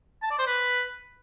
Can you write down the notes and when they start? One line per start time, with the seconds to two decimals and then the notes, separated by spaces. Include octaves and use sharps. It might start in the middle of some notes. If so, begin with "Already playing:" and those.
0.23 A5
0.31 D5
0.39 C5
0.47 B4